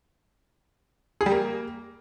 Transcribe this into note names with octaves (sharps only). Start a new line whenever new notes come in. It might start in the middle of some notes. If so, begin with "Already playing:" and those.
G#4
G3
A#3